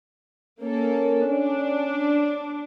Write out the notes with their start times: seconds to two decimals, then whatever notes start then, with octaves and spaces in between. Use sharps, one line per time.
0.61 A#3 C#4 A4
1.28 D4